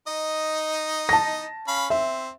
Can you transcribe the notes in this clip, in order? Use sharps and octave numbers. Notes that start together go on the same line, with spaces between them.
D#4 D#5
A5 A#6
C#4 F5 B5
C4 E5